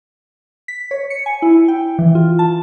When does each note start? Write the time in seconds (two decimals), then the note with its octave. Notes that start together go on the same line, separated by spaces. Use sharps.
0.68 B6
0.91 C#5
1.10 C#7
1.26 G#5
1.42 E4
1.68 G5
1.99 E3
2.15 F4
2.39 A5